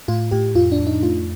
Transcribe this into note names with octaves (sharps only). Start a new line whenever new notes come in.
A2 F4
A2 G4
F2 F4
D4
F2
D#4
A3 F4